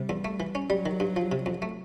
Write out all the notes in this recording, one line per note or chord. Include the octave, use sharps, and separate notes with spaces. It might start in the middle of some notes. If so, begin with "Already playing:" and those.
Already playing: C3 G3
E2
A3
E3
C#4
F#3 G3
D#3
G2
F3
C3
F2
A3